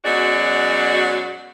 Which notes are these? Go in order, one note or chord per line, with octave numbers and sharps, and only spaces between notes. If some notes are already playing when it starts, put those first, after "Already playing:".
F#2 B2 F#3 G#3 F#4 D5